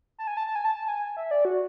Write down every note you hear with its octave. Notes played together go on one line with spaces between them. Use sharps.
A5
G#5
A5
A5
G#5
A5
A5
G#5
E5
D5
F#4